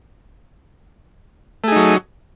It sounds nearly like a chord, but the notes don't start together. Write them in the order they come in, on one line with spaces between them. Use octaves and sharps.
A3 G#4 D#4 F#3